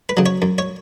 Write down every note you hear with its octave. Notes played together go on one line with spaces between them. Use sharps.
B4
C#3 F#3
C#5
F#2
C#5